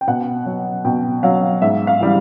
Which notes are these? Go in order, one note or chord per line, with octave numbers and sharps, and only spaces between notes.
G5
B2 F#5
F#3
B2 G5
F#3 F5
G#2 E5
F5
E3 G3